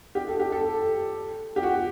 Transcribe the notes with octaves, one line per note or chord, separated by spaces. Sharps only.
G4
A4
G4
A4
G4
F#4